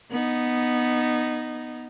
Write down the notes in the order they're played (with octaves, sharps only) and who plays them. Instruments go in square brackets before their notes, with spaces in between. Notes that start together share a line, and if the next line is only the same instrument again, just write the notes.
[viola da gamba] B3 D#4